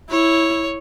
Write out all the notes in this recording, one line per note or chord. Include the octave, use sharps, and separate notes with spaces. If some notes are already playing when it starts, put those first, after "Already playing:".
E4 C#5